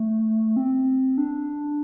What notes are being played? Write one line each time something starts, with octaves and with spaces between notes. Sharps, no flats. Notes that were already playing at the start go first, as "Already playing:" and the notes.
Already playing: A3
C4
D4